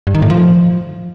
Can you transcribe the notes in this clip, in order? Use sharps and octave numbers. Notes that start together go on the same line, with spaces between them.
G2
D#3
A2
F3